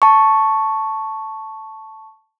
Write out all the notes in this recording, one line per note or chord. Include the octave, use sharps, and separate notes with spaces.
A5 C#6